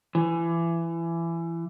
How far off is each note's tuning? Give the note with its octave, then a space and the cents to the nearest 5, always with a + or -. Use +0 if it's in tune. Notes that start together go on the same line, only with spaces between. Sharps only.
E3 +25